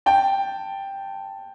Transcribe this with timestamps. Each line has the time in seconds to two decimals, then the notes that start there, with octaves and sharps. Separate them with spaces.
0.06 G5 A5